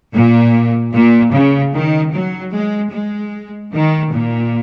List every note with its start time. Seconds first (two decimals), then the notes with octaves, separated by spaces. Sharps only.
0.13 A#2
0.92 A#2
1.32 C#3
1.73 D#3
2.13 F#3
2.53 G#3
2.92 G#3
3.72 D#3
4.12 A#2